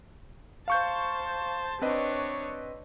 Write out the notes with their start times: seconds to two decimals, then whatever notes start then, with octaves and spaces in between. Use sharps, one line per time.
0.68 C5 F5 A5 C#6 G6
1.82 C4 D4 B4 C#5 D#5